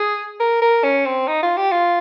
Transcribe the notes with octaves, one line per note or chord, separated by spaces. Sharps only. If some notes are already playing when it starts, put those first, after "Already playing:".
Already playing: G#4
A#4
A#4
C#4
C4
D#4
F4
G4
F4